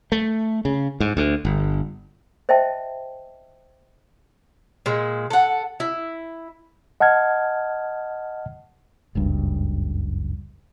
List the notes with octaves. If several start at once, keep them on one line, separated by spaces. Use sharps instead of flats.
A3
C#3
G#2
D2
G1
C5 D#5 E5 G5 A5
A#2 G#3
A4 F#5
E4
D#5 F#5 A5 F6 G#6
F#1 C#2 G2